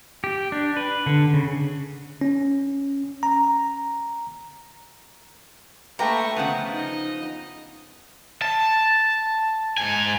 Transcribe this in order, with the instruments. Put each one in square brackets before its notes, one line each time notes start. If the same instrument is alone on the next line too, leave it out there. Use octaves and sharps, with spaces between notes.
[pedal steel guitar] G4
D4
B4
D3
C#3
[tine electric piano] C#4
A#5
[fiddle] A3 C#6 [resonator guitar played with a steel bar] A#3 B4 G5 [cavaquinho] A#5
[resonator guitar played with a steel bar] C#3 F3 B3 [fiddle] F#5
[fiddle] D#4 D#5
[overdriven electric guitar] A5
G#2 G#5